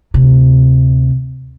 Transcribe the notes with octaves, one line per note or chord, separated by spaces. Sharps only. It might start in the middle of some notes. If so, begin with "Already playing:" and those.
D2 C3